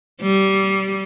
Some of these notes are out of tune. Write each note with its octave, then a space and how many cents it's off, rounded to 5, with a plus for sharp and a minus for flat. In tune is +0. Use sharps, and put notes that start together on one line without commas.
G3 -20